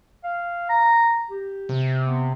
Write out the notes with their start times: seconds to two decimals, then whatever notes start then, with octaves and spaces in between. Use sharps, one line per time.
0.24 F5
0.69 A#5
1.30 G4
1.69 C3
2.07 B3